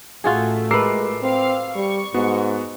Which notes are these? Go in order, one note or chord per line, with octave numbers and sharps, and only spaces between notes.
A1 A3 F4 F#4 G#4
G#3 A#4 B4 D6 E6 C7
C4 F5
G3 C#6
G#2 B3 F#4